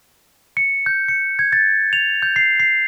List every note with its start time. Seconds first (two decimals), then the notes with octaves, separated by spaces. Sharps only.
0.57 C#7
0.86 G6
1.08 C#7
1.39 G#6
1.53 A6
1.93 F7
2.22 G6
2.36 C7
2.60 C7